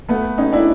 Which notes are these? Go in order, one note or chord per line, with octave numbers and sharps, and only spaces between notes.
A3 B3
C#4 D#4
D4 E4